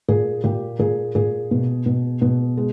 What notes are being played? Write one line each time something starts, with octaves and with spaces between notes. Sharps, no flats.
A#2 G#4
A#2 G4
A#2 G#4
A#2 G#4
B2
B2
B2
G#3